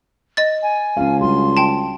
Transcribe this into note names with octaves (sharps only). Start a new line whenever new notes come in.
D#5 A6
G#5
C#2 C#4 F5
G3 D4 F#4 C6
G5 A5